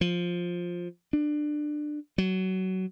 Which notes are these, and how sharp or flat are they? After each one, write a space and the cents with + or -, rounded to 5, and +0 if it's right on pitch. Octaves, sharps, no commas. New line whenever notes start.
F3 +10
D4 +20
F#3 +20